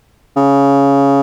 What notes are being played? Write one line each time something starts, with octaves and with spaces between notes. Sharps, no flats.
C#3